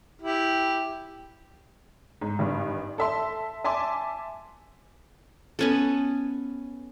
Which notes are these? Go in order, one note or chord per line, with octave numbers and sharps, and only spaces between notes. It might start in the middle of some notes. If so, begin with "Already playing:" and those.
E4 G4
G#2
G#1 G2
A4 E5 C6
E5 G#5 A5 C6 D6
B3 C#4 A4